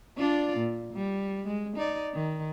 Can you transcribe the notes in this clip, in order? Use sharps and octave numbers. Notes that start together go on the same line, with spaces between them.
D4 F4 D5
A#2
G3
G#3
D#4 D5
D#3